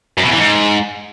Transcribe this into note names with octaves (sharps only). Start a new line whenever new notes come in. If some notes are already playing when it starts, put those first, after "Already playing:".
F#2
B2
E2
E3
G#2